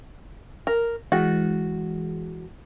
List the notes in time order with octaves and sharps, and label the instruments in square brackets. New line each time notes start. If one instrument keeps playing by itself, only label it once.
[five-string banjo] A#4
[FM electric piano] E3 G#3 [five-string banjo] F#4